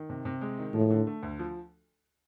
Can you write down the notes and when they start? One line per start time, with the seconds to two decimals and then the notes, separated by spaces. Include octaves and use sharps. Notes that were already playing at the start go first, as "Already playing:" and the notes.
Already playing: D#3
0.10 C3
0.25 C3
0.41 G#3
0.59 D#3
0.74 A2 F3
0.91 D3
1.07 A3
1.23 D2
1.39 F3